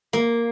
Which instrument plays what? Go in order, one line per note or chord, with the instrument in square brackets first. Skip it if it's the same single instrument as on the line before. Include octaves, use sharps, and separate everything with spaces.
[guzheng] A#3